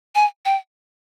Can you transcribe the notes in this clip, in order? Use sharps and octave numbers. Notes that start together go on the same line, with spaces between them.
G#5
G5